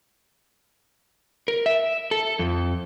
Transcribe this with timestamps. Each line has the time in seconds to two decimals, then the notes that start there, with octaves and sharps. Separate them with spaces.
1.48 A#4
1.66 E5
2.11 A4
2.39 F2